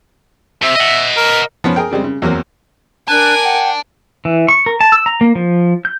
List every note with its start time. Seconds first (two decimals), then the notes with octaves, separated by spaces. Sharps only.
0.63 C3 E5
0.76 D#5 F#5
1.17 A#4
1.64 F3 B3 C#4
1.76 G#4 A#4 G5
1.91 C#3 G3 G#3 C4
2.04 C#3
2.22 E2 F#3 A#3 C4
3.08 D4 A#4 D5 G#5 A5 F#6
3.44 F#5 G5
4.25 E3
4.48 C#6
4.66 A#4
4.81 A5
4.92 E6
5.06 A#5
5.21 A#3
5.35 F3
5.85 G6